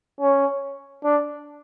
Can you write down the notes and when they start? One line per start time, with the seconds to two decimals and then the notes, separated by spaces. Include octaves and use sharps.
0.20 C#4
1.04 D4